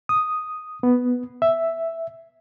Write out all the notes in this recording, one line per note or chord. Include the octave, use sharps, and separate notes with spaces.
D#6
B3
E5